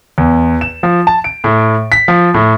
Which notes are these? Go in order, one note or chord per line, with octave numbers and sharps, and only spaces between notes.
E2
E7
F3
A5
D7
A2
B6
F3
A2